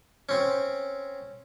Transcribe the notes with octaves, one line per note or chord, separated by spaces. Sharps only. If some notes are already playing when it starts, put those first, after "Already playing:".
C4 C#4